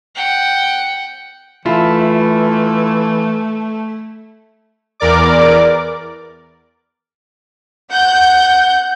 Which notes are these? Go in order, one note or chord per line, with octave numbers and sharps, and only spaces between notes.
F#5 G5
E3 A3 E4 F4
E2 A#4 D5 D6
F#5 G6